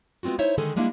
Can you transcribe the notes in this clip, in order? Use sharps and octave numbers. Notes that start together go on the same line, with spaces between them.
G#3 B3 C4 F4 F#4
D#4 E4 C5 C#5 E5
D3 D#3 G#3 G#4 A4
G3 G#3 A#3 D4 E4